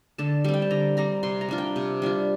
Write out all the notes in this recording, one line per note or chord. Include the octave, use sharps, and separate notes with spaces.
D3 A5
G3 C4
G5
A5
D3 A#5
G3 C4 A#5
C3 C6
A#5
G3 D4 F4
G5
C3
G3 D4 F4